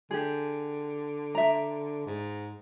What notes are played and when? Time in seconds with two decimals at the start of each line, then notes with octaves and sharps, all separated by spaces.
0.11 D3 G4 G#4
1.35 E5 A#5
2.06 G#2